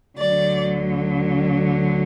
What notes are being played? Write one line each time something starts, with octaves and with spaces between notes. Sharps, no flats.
D2 D3 F#3 D5